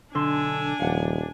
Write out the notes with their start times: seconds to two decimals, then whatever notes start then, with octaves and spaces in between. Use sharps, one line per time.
0.15 B1 D3 D4 G#5 C6 E6
0.80 D#1 F3 F5 F#5